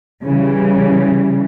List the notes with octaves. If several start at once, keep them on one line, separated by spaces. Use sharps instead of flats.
C#3 E3 G3